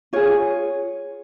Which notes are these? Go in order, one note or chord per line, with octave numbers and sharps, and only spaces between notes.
F4 G#4 C#5